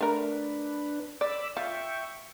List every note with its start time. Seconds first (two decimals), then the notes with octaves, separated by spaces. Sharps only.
0.01 A3 D4 A#4 B4
1.21 D5 B5 D6 E6
1.57 F4 E5 G5 C#6